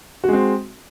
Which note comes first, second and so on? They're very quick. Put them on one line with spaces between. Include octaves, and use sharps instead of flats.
F#4 G#3 C4